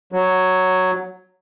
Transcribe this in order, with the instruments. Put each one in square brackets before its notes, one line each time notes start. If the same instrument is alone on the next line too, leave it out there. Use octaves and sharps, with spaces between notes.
[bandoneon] F#3